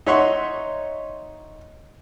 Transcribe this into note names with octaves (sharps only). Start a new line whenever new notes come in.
D#4 C#5 E5 F#5 C6 C#6